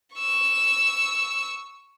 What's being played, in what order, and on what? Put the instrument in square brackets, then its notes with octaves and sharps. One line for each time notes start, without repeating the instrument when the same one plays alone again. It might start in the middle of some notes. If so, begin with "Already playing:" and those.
[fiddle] C#6 E6